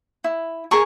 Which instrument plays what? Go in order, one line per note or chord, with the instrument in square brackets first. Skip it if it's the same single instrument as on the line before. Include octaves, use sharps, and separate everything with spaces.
[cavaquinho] E4
G#4 A#4 G#5 C#6